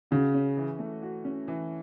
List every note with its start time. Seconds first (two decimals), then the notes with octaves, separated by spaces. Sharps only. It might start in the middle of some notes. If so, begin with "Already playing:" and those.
0.11 C#3 F#4
0.34 C#4
0.57 E3
0.79 A3
1.03 F#4
1.25 C#4
1.48 E3